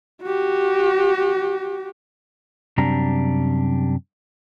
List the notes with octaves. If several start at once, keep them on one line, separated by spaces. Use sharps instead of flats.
F#4 G4
F#2 C3 G3 D4 A#5